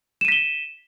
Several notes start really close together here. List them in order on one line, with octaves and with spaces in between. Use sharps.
E7 D#7 B6 G7